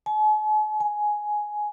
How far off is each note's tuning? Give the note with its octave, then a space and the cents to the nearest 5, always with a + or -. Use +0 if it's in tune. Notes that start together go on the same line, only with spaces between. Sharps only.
G#5 +45
G#5 +10